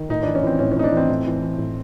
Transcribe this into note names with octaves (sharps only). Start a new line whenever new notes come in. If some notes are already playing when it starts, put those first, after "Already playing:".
Already playing: D#3
A2 D#4
E3 D4
C#4
E3 C4
A2 C#4
C#4
A2 D#4
D4
E3
C4
A2
E3
E3
A2